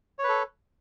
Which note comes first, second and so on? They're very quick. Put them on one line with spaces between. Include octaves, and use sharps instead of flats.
C#5 B4 A4